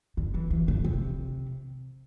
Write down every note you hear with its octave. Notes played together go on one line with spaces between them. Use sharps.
D3
E3
E3
D3
C3